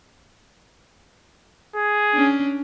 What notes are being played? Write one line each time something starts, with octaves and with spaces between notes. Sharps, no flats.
G#4
C#4 D4